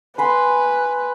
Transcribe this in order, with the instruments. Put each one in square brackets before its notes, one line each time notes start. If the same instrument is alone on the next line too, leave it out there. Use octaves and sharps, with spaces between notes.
[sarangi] B4 [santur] G#5 B5 C6